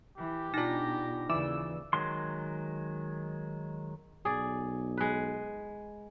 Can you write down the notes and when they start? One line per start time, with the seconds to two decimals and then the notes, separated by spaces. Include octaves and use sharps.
0.18 E3 G4
0.54 B2 D4 D#4 F4 A#6
1.29 D#2 C#3 E3 D5 E6
1.93 D#3 F#3 G#3 C6
4.25 B1 G#4 D5
4.97 G#3 B4